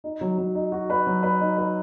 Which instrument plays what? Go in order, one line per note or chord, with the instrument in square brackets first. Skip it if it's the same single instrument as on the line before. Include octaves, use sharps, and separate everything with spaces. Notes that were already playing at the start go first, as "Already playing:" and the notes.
[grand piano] D#4
F#3
F#3
D#4
F#4
B4
F#3
B4
D#4
B4